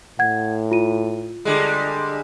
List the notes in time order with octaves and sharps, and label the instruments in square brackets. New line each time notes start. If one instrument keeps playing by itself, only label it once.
[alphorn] A2 [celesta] F#5 G#6
[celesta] F4 D#7
[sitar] D3 G3 G#3